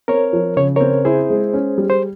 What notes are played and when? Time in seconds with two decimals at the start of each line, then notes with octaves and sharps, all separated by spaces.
0.08 C4 A#4 C#5
0.33 F3
0.57 C#3 C#5
0.76 C4 A#4 C#5
1.05 E4 G#4 C5
1.30 G#3
1.54 C#4
1.78 G3
1.90 C5